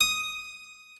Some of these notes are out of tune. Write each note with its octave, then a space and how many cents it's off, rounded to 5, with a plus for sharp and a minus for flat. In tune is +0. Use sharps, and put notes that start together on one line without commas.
D#6 +5